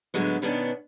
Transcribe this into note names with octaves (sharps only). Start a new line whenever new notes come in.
A2 D3 F#3 G#3 B3
B2 D#3 B3 C#4 D4